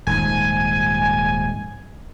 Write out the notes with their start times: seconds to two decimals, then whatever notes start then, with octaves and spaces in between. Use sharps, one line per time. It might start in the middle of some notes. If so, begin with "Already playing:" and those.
0.07 D#1 G#2 F3 G#5